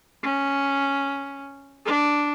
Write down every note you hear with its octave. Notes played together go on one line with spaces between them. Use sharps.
C#4
D4